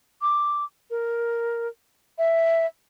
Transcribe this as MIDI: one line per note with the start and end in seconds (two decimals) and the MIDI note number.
0.22 0.64 86
0.90 1.68 70
2.18 2.66 76